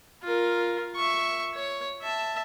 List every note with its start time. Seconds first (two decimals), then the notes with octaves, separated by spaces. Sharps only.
0.23 F4 A#4
0.95 E5 C#6
1.55 C#5
2.02 E5 A5